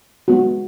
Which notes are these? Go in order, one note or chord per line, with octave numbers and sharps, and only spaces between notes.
G#3 B3 F#4